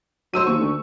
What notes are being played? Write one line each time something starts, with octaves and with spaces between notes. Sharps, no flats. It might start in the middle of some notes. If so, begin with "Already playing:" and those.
F#3 C5 E6 D#7
D#2 C#6
D2